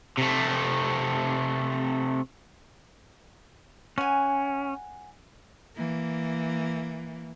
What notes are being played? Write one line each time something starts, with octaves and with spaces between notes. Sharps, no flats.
C3 A3
C#4 F#5 G#5
E3 A#3